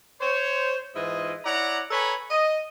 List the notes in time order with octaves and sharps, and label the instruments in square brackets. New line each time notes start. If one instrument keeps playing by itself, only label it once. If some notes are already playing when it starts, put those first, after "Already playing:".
[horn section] C5 C#5
G#2 E3 E4 F4 D#5
E4 C#5 D5 F#5 A#5
A4 B4 C#5 G#5 A#5 B5
D#5